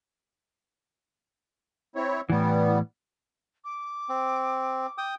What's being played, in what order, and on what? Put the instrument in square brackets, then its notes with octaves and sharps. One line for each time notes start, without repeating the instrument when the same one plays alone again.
[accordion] C4 E4 C#5
[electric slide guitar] A2 E3 [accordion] G3 B3
[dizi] D6
[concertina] C4
G5 D#6